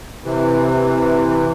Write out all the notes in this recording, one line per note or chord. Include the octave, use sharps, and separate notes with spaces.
C3 E3